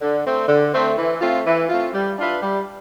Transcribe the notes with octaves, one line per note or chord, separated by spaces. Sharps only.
D3
A3 C4
D3
A3 C4
E3
A3 C4 F4
E3
A3 C4 F4
G3
D4 F4 B4 E5
G3